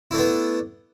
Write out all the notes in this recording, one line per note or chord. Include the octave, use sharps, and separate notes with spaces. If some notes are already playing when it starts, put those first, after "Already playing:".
A3 B3 D4 E4